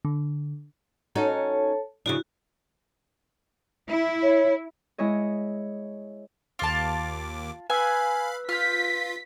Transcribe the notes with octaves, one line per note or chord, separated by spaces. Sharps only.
D3
C#4 D#4 F#4 A4 C#5 A5
C#3 F3 D4 E4 F#4
E4
C#5
G#3 E4 C#5 D#5
D#2 F4 A5 D6
B4 F5 G#5 B5 E6
F4 F6 G6 B6